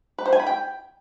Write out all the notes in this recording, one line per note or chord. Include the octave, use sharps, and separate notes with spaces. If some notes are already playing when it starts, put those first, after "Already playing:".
B4
C5
G#5
B5
G5